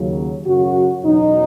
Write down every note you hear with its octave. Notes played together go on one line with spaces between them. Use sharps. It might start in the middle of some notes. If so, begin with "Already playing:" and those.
Already playing: D#2 C#3 F#3
F#2 C#3 F#3 F#4
E2 B2 F#3 D#4